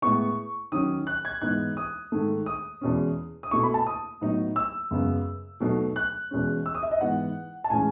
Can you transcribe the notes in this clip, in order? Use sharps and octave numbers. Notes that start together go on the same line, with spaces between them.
A2 G#3 B3 E4 C#6
D#3 F#3 C#4 D#6
F#6
G#6
G#2 E3 B3 D#4 F#6
D#6
G#2 D#3 A3
D#6
E2 B2 G#3 C#4
D#6
B2 A3 E4 C#6
B5
A5
D#6
A2 F#3 B3 D#4
E6
F#2 C#3 G#3 B3
B2 F#3 A3 D#4
F#6
E2 B2 G#3 C#4
E6
D#6
E5
D#5
G#2 E3 B3 E4 F#5
A5
A2 E3 G#3 C#4 G#5